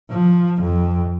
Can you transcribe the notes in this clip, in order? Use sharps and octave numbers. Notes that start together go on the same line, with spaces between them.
F3
F2